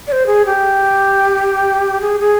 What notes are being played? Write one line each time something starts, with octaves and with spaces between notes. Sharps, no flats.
D5
C5
G#4
G4
G#4
G#4